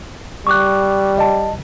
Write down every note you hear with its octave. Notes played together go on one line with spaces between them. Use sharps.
G3 C#6 D6 F#6
D#5 A5